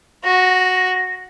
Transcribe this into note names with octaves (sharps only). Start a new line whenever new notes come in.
F#4 A#6